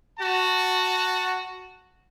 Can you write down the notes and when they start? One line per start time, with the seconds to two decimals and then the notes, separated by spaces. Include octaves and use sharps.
0.19 F#4 A5